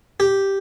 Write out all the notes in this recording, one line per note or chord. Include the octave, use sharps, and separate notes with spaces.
G4